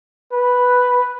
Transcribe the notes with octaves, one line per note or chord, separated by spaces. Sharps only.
B4